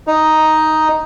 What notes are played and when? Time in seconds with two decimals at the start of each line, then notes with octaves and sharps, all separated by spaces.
0.07 D#4